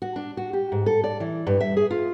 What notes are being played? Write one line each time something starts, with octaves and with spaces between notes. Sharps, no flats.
F#4
D4
F#4
G4
G#2
A4
D5
E3
G2
E5
G#4
F4